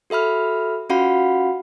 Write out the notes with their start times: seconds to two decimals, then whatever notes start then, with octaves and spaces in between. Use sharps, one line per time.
0.10 F#4 A4 E5 B5 F6
0.90 C#4 F4 F#4 F5 F#5 B5